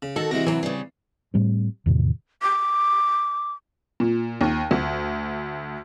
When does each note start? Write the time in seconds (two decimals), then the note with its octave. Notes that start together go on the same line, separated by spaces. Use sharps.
0.02 C#3
0.16 D#3 F#4 A4
0.31 C3 E3 G#3 A#6
0.47 C3 E3 F#3 C4 C#5
0.63 C#3 G3
1.34 A2 G3 C4
1.86 E2 A2 C3 D#3
2.42 D6
4.00 A#2
4.41 D#2
4.71 D2